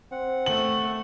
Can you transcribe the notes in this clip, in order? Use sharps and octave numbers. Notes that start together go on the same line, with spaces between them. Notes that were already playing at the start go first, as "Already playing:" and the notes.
C4 F#5
A3 F#7